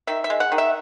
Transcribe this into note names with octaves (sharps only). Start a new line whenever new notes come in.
D#3 E5
E5
G#3
F#5
D#3
E5